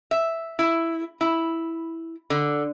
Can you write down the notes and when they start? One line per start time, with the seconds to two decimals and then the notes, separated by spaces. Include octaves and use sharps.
0.11 E5
0.59 E4
1.21 E4
2.30 D3